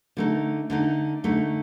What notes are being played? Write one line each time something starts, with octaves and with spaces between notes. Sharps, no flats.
D3 A3 D#4
D3 A3 D#4
D3 A3 D#4